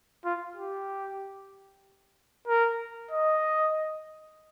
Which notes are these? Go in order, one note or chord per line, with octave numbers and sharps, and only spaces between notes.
F4
G4
A#4
D#5